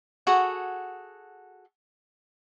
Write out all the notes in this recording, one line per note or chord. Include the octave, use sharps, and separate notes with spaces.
F#4 G#4 A4 F#5